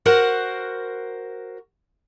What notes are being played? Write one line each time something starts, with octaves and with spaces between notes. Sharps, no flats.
F#4 A#4 C5 F#5